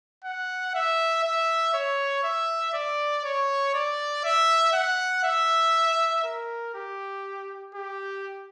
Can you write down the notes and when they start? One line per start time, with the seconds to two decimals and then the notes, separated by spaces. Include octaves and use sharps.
0.24 F#5
0.74 E5
1.24 E5
1.74 C#5
2.24 E5
2.73 D5
3.24 C#5
3.74 D5
4.24 E5
4.73 F#5
5.24 E5
6.24 A#4
6.75 G4
7.75 G4